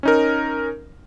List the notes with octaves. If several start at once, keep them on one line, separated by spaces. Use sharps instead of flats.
C#4 D#4 A#4